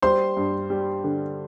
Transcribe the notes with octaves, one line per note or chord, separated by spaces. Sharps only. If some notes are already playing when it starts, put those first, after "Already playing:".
G3 C5 C6
G2
G3
D3